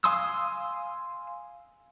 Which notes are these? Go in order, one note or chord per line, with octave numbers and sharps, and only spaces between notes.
F5 G#5 C6 D#6 E6